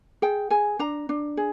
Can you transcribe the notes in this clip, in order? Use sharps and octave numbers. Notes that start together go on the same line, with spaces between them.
G#4 G5
G#4 G#5
D4 A#5
D4
G#4